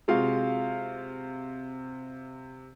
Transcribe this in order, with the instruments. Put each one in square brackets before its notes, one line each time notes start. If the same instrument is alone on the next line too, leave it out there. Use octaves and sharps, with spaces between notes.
[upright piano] C3 F5 [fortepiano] G#3 F4 F#4